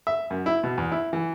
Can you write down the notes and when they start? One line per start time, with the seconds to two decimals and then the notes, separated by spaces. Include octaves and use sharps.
0.07 E5
0.30 F#2
0.46 E4
0.63 B2
0.78 E2
0.92 E4
1.13 E3